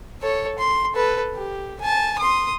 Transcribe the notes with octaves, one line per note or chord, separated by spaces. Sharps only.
A4 C#5
C6
A4 B4
G4
G#5 A5
C6 D#6